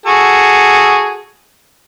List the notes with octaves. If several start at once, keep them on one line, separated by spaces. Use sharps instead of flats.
F#4 G#4 A4